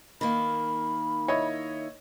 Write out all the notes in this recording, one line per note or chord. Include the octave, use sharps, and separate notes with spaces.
D#3 A#3 B5
E4 C#5 D#5